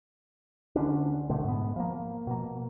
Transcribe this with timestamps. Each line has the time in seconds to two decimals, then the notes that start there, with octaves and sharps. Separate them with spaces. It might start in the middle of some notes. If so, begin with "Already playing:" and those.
0.76 D2 D3 C#4 D4
1.29 B2 D3 A3
1.44 G#2 B3
1.76 F3 A#3
2.27 B2 A#3